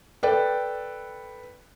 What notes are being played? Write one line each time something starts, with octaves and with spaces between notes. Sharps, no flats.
A4 B4 D5 G5